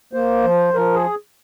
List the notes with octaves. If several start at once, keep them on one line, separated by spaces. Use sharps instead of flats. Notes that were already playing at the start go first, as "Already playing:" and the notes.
A#3 C5
F3
F3 A#4
G#4